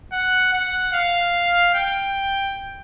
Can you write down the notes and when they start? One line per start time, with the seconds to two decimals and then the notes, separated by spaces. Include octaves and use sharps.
0.12 F#5
0.53 F#5
0.93 F5
1.74 G5